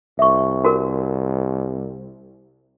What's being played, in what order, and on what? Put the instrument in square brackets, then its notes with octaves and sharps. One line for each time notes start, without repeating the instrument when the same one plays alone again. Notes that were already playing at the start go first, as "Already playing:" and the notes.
[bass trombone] C2 [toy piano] E5 C#6
[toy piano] F#4 A#4